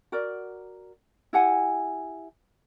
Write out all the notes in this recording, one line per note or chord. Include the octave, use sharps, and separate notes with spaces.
F#4 A#4 D5
E4 G4 F#5 G#5